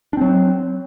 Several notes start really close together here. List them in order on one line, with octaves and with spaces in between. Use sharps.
D4 C4 F#3